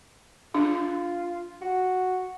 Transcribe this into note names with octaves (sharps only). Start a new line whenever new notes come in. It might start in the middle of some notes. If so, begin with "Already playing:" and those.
D4 F4
F#4